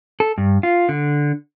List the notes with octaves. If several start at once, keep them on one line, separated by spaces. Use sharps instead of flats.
A4
G2
F4
D3